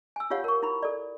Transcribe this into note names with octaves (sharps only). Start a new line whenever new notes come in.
G#5 E6
F4 G4 C#5 F5 F#5
A#4 C#6
E4 B5
A4 D5